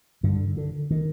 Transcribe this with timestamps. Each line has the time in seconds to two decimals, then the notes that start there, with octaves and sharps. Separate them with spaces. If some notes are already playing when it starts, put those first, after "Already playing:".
0.23 G2 D3
0.57 D3
0.91 D#3